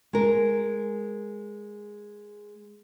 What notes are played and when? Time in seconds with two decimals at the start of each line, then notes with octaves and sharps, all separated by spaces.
0.13 G#3 A#4